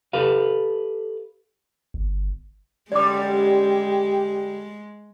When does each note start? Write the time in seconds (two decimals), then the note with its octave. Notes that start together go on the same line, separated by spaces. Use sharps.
0.13 G4 A4 B4 F5
1.94 G1
2.92 F#2 D3 G3 G#3 G4 D5 D6